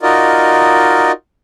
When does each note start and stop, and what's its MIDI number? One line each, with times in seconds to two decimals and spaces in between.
0.02 1.12 63
0.02 1.12 65
0.02 1.12 66
0.02 1.12 70
0.02 1.12 74
0.02 1.12 75